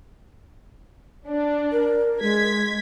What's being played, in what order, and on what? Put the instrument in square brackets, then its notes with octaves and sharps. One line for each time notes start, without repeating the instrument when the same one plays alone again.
[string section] D4
[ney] A#4
[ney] G#3 [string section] G#6 B6